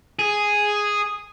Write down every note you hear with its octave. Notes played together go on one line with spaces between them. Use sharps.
G#4